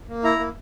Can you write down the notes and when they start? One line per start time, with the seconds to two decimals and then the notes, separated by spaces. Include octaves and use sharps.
0.09 A#3
0.24 E4 A#5
0.39 A#3